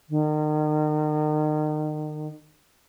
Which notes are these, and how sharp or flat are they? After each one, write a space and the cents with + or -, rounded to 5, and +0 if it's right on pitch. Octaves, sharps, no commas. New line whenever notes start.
D#3 -35